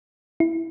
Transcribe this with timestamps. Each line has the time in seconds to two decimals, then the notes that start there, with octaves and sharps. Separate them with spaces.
0.40 E4